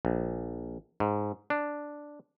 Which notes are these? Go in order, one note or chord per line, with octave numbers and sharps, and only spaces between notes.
A#1
G#2
D4